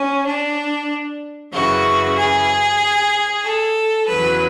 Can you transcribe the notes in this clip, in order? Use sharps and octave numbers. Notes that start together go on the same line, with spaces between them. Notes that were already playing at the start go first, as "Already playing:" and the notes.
Already playing: C#4
D4
F#2 C#3 E3 F#4
G#4
A4
E2 C#3 F#3 B4